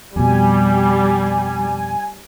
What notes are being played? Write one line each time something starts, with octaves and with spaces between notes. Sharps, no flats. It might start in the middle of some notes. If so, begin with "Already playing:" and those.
F2 B2 G3 G#5